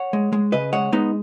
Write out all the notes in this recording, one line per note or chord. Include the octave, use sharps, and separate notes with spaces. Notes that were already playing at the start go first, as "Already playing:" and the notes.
Already playing: C#5 F#5
G#3
G#3
C#3 B4 D#5
G#3 C#5 F#5
G#3 B3 D#4